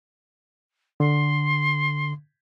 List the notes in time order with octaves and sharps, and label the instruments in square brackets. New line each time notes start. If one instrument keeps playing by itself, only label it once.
[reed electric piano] D3 [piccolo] C6